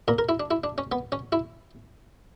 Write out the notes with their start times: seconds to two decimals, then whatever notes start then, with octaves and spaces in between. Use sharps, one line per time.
0.08 A#2 A#4
0.18 A#4
0.29 E4
0.40 D4
0.51 E4
0.64 D4
0.78 C#4
0.92 B3
1.12 C#4
1.32 E4